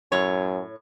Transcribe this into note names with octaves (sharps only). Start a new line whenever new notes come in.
F#2 A2 C#5